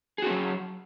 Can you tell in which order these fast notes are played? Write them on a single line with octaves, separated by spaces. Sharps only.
G#4 F#4 C#4 F#3